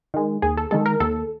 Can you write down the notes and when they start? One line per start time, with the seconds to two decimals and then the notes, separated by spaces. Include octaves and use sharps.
0.14 D#3 G#3
0.42 D#2 G#4
0.57 A4
0.71 D#3 G#3 A4
0.86 A#4
1.00 D#2 A4